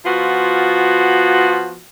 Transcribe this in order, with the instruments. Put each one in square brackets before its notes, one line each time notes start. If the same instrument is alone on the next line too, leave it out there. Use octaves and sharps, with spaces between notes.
[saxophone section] F3 B3 F4 F#4